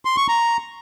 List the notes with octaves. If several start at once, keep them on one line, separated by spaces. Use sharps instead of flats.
C6
C#6
A#5